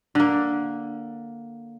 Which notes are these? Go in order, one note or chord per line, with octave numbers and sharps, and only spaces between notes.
D3 A#3